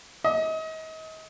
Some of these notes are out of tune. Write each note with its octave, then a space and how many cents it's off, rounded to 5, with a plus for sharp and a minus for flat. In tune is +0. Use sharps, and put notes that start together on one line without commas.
D#5 +35